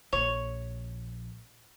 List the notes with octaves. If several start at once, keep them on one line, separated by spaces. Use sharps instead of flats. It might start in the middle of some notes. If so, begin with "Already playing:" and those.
A#1 C#5